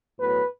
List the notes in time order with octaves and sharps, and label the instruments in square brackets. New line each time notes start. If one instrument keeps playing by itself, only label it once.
[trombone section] A2 F#3 B3 B4